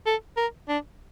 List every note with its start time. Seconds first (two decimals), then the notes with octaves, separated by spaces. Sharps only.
0.06 A4
0.37 A#4
0.68 D4